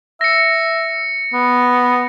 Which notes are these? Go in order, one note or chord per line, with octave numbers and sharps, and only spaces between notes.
E5 A#6 C#7
B3